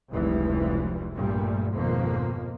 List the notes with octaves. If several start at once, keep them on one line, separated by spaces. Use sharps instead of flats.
F1 C#2 E3 F3 G3
A#1 G2 A#2 G3 A3
G#1 F2 B2 F3 A#3